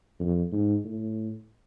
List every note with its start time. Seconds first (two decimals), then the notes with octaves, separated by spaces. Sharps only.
0.20 F2
0.52 G#2
0.84 A2